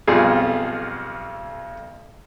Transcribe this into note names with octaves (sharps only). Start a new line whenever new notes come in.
B1 F2 G3 F4 G#4